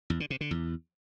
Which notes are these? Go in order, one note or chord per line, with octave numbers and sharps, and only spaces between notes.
E2
D3
C3
D3
E2